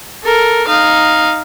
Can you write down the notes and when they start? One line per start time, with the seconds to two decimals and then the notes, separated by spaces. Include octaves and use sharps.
0.24 A4 A#4
0.68 D#4 F5